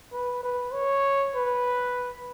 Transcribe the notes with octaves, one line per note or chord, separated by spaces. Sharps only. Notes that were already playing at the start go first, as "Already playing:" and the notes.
B4
B4
C#5
B4